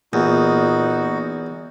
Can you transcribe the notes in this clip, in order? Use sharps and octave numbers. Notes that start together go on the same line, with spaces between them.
E2 A#2 D#4 F#4